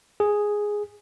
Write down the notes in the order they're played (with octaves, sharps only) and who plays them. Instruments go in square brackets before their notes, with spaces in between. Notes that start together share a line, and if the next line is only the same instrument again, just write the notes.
[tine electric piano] G#4